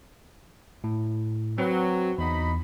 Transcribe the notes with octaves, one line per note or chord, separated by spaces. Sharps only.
A2
F#3 C4 B4
E2 D#4 B5